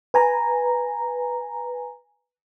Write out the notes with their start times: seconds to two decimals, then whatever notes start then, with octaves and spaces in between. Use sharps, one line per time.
0.14 B4 G#5 A#5